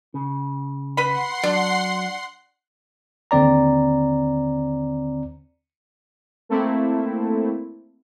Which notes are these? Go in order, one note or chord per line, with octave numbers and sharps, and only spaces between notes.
C#3
B4 F#5 B5 C6 C7
F#3 D4
D#2 D3 C4 D5 A#5
A3 A#3 C4 E4